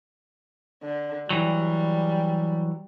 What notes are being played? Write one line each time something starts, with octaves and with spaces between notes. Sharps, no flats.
D3
E3 F#3 G3